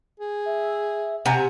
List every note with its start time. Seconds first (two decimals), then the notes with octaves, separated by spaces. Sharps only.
0.20 G#4
0.46 E5
1.26 C3 F#5 G#5 A#5